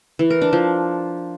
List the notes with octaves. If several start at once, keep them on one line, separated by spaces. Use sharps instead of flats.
E3
A#4
D4
F3